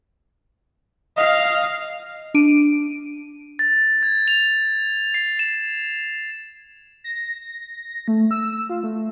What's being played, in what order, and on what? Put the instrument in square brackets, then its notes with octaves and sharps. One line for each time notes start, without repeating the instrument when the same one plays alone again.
[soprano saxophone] D#5 [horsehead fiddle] F5
[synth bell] D4 D7 D#7
[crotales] A6
G#6
F7
C7
E7
[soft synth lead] A#6
A3
E6
F4
A3